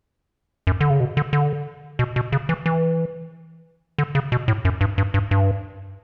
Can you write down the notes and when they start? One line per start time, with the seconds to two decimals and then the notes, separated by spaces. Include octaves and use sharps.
0.67 F#2
0.81 D3
0.90 C#3
1.00 B2
1.17 D3
1.33 D3
1.99 B2
2.16 B2
2.32 C#3
2.49 E3
2.66 E3
3.98 D3
4.15 C#3
4.32 B2
4.48 A2
4.65 F#2
4.81 G2
4.98 G2
5.14 G2
5.31 G2